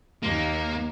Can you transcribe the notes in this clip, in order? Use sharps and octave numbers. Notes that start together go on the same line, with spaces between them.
D#2 A#3